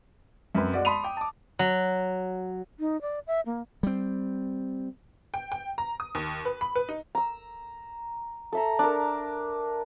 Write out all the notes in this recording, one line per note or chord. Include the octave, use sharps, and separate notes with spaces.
F#2 C4 B4
G#3 F#4 D5
A5 B5 C6 D#6 D#7 F7
G5 D6
A5 D6
F#3
D#4
D5
E5
A#3
G3 C4
G5
G5
A#5
D#6
D#2
B4
B5
B4
D#4
A#5 E6
A4 E5 A#5
D4 A#4